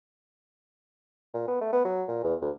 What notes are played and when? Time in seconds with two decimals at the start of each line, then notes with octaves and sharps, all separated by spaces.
1.34 A#2
1.47 B3
1.61 A3
1.73 B3
1.85 F#3
2.08 A#2
2.24 E2
2.41 D2